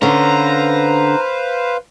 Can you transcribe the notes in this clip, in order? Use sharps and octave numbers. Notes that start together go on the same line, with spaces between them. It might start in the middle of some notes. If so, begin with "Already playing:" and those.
D3 C#4 B4 C5 F5 A#5